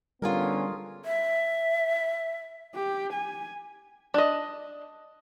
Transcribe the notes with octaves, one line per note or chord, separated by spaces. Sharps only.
D3 G3 B3 C#4 F4 G#4 A#4
E5
G4
G#5
D4 D#5